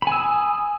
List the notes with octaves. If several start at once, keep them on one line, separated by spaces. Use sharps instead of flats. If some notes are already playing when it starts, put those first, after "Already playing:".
G#5 B5 D#6 E6